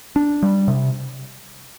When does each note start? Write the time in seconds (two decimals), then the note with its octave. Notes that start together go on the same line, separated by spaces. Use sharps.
0.16 D4
0.43 G3
0.68 C3